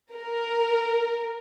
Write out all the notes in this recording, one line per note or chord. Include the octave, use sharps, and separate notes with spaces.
A#4